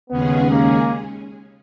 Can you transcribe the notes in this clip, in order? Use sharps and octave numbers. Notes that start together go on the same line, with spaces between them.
D#2 C#3 G#3 B3 C#4 G#4
A#3